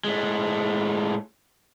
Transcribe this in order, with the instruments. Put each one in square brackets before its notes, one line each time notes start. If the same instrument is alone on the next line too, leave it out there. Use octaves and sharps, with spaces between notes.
[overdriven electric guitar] A2 G#3